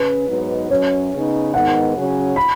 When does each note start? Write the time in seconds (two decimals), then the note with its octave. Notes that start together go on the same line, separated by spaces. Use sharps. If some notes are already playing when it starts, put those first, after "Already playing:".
Already playing: C#3 C#4 B4
0.29 G#2 F#3 B3 D#4
0.70 F#2 F#3 C#4 C#5
1.13 C#3 B3 D#4
1.53 G#2 D#3 B3 F#5
1.95 C#3 F#3 C#4
2.36 B5